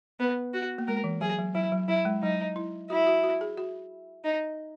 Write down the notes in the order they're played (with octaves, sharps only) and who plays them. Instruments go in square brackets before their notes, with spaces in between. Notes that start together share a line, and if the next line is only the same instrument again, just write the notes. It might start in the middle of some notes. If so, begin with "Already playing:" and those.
[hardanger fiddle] B3
F#4
[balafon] A#3
[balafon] G#3 [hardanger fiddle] A#4
[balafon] E3
[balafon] F#3 [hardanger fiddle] G#4
[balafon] F#3
[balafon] F#3 [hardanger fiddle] E4
[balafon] F#3
[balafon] F#3 [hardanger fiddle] E4
[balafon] G#3
[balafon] F#3 [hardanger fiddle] D#4
[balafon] E4
[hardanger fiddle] E4 [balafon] F#4
[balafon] F#4
F#4
G#4
F#4
[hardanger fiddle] D#4